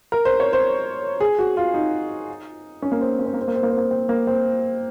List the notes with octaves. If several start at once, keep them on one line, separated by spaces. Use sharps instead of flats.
A#4
C5
C#5
C5
G#4
F#4
F4
D#4
C#4
A#3
C4
A#3
C4
A#3
C4
A#3
C4
A#3
C4
A#3
C4
A#3
C4